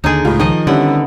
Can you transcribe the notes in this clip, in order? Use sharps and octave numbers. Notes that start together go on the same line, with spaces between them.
D#2 D3 D#4 G#4
C#2 A2 G#3 F4
D#3 F3 D#5
D3 G3 B3 C#4 E4